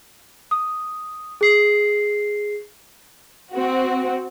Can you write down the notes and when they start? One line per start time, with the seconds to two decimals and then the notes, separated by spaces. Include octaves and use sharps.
0.51 D#6
1.41 G#4 C7
3.54 C4 F#4